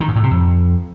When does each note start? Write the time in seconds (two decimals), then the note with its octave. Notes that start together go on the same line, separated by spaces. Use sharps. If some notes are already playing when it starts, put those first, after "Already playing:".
0.01 D#3
0.08 G#2
0.16 A2
0.23 C3
0.31 F2